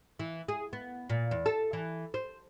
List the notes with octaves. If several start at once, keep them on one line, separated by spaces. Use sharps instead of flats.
E3
G#4
B3
A#2
E2
A4
E3
C5